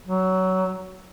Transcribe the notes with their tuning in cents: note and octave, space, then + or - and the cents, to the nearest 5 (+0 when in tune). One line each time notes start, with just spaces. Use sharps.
F#3 +20